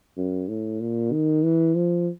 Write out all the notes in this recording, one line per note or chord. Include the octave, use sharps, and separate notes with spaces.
F#2
A2
A#2
D#3
E3
F3